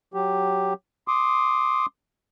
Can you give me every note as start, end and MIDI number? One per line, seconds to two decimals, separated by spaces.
0.14 0.74 54
0.14 0.74 67
1.08 1.86 84
1.08 1.86 86
1.08 1.86 87